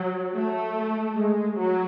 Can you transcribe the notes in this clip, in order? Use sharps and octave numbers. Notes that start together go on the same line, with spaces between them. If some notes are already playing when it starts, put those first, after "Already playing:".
Already playing: F#3
A3
G#3
F#3